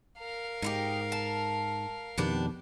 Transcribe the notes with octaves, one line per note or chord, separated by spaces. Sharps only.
A#4 F5
G#2 D#4 E4 G4
A5
F2 B2 D#3 B3 D4 G4